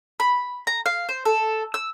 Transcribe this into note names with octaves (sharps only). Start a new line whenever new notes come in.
B5
A#5
F5
C5
A4
E6